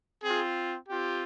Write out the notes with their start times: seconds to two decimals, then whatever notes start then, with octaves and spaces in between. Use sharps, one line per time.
0.24 C4 F4 G#4
0.89 C4 F4 G4